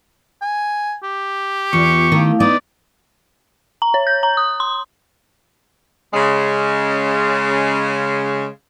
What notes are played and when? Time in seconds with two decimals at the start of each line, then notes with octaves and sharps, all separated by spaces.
0.41 G#5
1.03 G4
1.73 E2 F4 C#6
2.12 D#3 A3 E4 F5
2.40 B3 D#4 D5
3.82 A#5
3.94 C#5
4.07 G6
4.23 A#5
4.37 D#6
4.60 C6
6.14 C#3 G#3